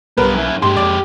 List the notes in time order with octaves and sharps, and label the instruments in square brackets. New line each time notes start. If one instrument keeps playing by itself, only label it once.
[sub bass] B1 [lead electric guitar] G2 B3 [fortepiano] A#4 B4
[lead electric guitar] F#2 E4
[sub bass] G2 [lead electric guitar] G#3 G4 [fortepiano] C6
[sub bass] F2 [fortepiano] D5